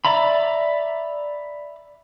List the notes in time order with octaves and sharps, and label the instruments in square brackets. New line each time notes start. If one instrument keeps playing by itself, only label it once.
[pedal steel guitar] D5 E5 A#5 B5